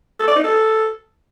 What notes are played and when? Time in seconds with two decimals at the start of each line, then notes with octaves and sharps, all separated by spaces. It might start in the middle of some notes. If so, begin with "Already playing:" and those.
0.20 A4
0.28 D5
0.36 D#4
0.44 A4